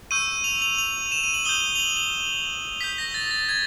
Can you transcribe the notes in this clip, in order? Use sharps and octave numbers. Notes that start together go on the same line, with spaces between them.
C#6 E6 G6 D#7
F7
F7
F7
E7
D#7
F#7
D#6 G6 G7
F7
F#7
F7
D#6 G6 B6
A#6
A6
A6
G#6